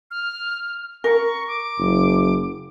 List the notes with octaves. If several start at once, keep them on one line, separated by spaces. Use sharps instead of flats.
F6
A#4 C#6
D6
F#1